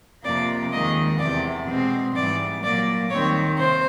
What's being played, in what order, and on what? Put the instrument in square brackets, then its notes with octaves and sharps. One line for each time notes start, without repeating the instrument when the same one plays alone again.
[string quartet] F2 C3 F3 A#3 D5
D#2 D#3 G#3 D#5
E2 C3 E3 D5
B2 G#3 C4
G#2 E3 G3 D5
A#2 F#3 A#3 D5
D#2 D#3 G3 C4 C#5
C3 C5